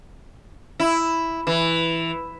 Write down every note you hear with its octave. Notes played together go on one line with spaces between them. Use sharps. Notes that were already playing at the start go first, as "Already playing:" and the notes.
E4
E3